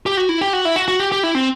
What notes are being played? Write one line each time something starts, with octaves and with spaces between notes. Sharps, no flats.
G4
F#4
E4
G4
F#4
E4
F#4
F#4
G4
G4
E4
C4